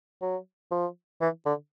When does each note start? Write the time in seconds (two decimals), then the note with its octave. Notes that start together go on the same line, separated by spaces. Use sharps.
0.21 F#3
0.71 F3
1.21 E3
1.45 D3